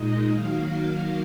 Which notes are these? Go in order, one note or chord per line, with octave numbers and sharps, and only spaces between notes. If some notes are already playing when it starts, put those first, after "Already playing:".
Already playing: A#2 G#3 D#4 D#5
D#3 F#3 A#3 F5